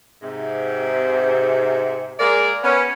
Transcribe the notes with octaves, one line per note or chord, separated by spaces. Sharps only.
G#2 C3
G#3 A#3 G#4 A#4 D5
B3 C#4